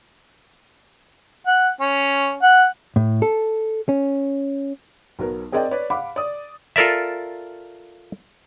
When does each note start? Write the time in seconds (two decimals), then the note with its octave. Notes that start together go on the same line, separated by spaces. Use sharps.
1.47 F#5
1.80 C#4
2.42 F#5
2.96 A2
3.22 A4
3.89 C#4
5.19 B1 F#3 B3 A#4
5.52 C4 G#4 A#4 D5 D#5 G5
5.71 B4 C#5 D5
5.90 F5 F#5 B5 D6
6.16 D5 D#6
6.76 F4 A4 A#4 D5 E5